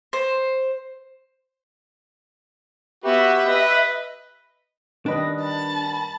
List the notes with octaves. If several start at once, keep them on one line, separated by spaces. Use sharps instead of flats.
C5
B3 F#4 G4 E5
B4 D#5
D#3 G3 D4 B4 D#5
A5 B5